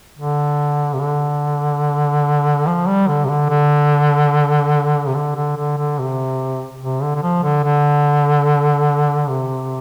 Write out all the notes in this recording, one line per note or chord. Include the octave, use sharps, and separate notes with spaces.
D3
C3
D3
F3
G3
D3
C3
D3
D3
C3
D3
D3
D3
D3
C3
C3
D3
D3
F3
D3
D3
C3